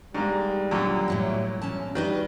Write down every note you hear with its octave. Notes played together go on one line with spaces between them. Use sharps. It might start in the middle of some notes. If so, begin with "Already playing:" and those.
G#2 G3 A#3
F#2 A#2 D3
A2 F#3 A#3
C#4 A5
D#3 G3 F#4 B4 D#5